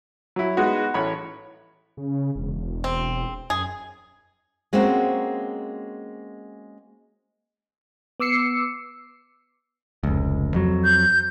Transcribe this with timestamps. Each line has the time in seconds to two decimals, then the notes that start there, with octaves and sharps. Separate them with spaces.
0.36 F#3 E4
0.57 G#3 B3 D#4 F#4
0.94 A1 C#5 B5
1.97 C#3
2.36 E1
2.84 C4
3.50 F#2 G#4
4.73 G#3 A#3 C4 C#4 F#4
8.20 B3 D6 E6 C7 C#7
10.03 F1 C#2
10.54 F2 F#3
10.84 G6